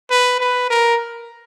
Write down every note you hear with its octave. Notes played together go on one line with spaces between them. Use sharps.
B4
B4
A#4